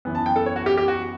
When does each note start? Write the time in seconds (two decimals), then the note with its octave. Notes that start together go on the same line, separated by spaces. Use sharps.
0.05 F#2 E3 B3
0.15 A5
0.26 G5
0.36 A4
0.46 C#5
0.56 F#4
0.66 G4
0.77 G4
0.88 F#4